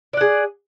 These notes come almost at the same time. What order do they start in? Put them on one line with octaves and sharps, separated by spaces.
D5 F#5 G#4